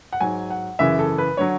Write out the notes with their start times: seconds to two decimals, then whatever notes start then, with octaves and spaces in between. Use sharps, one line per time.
0.13 F#5
0.21 G#2 F#3 G#5
0.50 F#5
0.79 F#2 C#3 E3 E5
0.99 A4
1.18 B4
1.37 D3 F#3 C#5